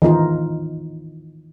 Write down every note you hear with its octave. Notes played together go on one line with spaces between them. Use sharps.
D#3 E3 D#4 F4